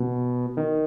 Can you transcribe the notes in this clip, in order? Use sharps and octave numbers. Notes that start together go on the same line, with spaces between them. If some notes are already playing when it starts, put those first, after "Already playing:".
Already playing: B2
D#3